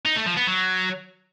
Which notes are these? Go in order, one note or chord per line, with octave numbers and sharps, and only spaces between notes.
D#4
A3
F3
B3
F#3